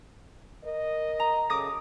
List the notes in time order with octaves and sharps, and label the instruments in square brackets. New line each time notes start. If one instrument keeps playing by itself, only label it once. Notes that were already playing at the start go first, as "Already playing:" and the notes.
[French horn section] A#4 D#5
[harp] A#5
[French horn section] F#2 C#3 A4 [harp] D6 D#6 A#6